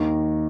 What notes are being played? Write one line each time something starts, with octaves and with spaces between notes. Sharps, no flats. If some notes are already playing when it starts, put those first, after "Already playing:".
Already playing: D#2 D#3 A#5